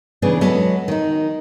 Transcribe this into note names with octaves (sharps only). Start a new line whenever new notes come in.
C#3 E3 B3 D4 G#4
F#3 G#3 B3 A4
D#3 D#4